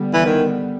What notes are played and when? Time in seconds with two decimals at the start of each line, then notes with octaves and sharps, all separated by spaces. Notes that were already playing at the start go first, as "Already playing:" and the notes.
Already playing: D3 G3 B3
0.14 E3
0.25 D#3